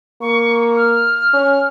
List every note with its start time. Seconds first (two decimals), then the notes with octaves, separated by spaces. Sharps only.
0.21 A#3 C#6
0.76 F6
1.34 C#4